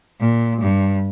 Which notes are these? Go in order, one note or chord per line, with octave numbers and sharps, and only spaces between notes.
A#2
G2